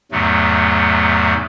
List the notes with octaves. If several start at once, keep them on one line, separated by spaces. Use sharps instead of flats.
E2 G#2 C3 F#3 A3